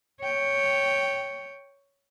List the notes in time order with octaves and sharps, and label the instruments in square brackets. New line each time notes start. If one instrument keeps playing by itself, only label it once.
[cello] C#5 G5